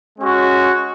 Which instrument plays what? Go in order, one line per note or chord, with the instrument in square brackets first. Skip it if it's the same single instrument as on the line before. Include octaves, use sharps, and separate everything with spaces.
[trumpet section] G#3 C#4 F#4